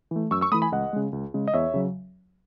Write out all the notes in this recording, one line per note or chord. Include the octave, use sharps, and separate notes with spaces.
E3 A3
F#2 C#6 E6
C#6 E6
E3 A3 B5 D#6
G#5 B5
C#2 D#5 F#5
C#3 G#3
C#2
C#3 G#3
D#5
E2 C#5 E5
C#3 F#3